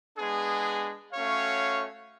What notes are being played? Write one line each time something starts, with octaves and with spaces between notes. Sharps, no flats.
G#3 B3 D4 G#4
A3 C#4 F#4 C#5 F5